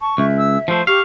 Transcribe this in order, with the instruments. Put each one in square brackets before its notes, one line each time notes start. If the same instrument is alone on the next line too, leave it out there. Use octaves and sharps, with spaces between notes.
[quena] A5 [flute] C#6
[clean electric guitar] C#2 [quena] E5
[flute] E6
[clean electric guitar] F3 A3 [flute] C5
[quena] G4 [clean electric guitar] F5 [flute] C#6